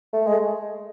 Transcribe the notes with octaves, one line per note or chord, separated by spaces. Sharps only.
A3
G#3